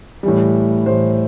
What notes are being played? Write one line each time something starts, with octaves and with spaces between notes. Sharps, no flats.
A2 E3 G3
A2 E3 G3 C5